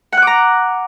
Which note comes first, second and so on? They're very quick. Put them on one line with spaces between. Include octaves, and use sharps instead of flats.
F#5 F#6 D6 A#5